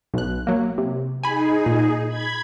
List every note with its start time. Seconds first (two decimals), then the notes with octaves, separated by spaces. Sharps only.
0.14 B1 F#6
0.47 F#3 A#3
0.78 C3
1.23 D#4 G#4 G#5 B5
1.66 A#2
2.08 B5 G#6